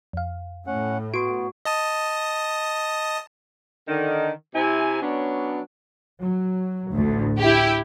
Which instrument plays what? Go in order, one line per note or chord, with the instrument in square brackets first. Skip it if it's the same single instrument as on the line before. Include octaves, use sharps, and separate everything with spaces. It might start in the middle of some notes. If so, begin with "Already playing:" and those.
[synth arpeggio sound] F2 F5
[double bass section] A2 [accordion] C#4 F#5
[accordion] B3 [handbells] F#4 [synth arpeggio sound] C6 D7
[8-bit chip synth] D#5 A5 D#6
[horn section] D3 D#3
C3 E4 G#5
F#3 B3 C#4 D4
[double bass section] F#3
[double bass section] A1 [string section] D2
[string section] E4 G4